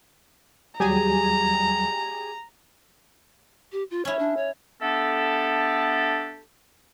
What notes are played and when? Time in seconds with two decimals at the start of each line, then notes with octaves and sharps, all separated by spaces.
0.80 D#2 F#3 G3 G4 G#4 G#5 A#5
3.72 G4
3.91 F4
4.05 C#4 E4 C#5
4.19 D4
4.37 C#5
4.81 A3 B3 D4 G4 A4